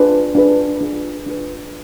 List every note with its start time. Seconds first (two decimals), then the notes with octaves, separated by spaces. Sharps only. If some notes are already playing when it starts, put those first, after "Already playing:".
Already playing: D4 F4 G#4 B4
0.35 D4 F4 G#4 B4
0.81 D4 F4 G#4 B4
1.26 D4 F4 G#4 B4